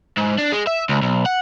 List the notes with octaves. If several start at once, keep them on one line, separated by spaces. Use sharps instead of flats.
G#2
D4
G#3
E5
C#2
B1
F#5